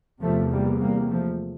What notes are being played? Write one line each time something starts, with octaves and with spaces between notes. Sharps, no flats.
E2 C3 F3 A3
G3 A#3
G3 A#3
F3 A3